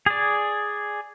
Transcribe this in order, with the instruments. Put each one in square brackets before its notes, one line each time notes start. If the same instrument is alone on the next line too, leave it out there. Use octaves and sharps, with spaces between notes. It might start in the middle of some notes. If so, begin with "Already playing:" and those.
[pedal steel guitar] G#4 D5